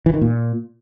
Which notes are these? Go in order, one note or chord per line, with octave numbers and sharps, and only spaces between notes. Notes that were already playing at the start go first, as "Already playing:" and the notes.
E3
D#3
A#2